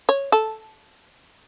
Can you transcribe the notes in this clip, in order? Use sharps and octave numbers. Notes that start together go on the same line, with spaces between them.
C#5
A4